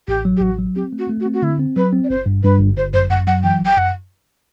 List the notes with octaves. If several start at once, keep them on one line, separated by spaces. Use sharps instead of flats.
A1 G4
F#3
G4
A1 F#4
F#3
C4 G4
A3
F#4
A3
F#4
C4
F#4
D3 E4
C4
F#3 B4
C4
D5
G1 C5
G2
G2 B4
G1
G1 C5
F#2 C5
F#2 F#5
F#3 F#5
E3 G5
G1
G5
F#2 F#5